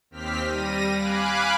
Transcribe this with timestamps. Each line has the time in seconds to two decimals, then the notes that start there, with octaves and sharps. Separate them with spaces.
0.11 D#2 C4 G4 F6 B6
0.48 G3 A#6 D#7
0.95 F5 G#5 B5 D6 F#6